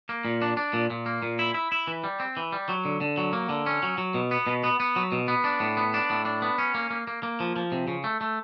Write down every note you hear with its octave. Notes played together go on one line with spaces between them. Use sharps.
A#3
A#2
D4
D4
A#2
A#2
A#3
A#2
E4
E4
E4
E3
G3
C4
E3
G3
F#3
D3
D3
F#3
A#3
D3
C#4
F#3
F#3
B2
B3
B2
B3
B3
F#3
B2
B3
D4
A2
B3
D4
A2
D4
B3
C#4
A#3
A#3
A#3
A#3
F3
F3
C3
C#3
A3
A3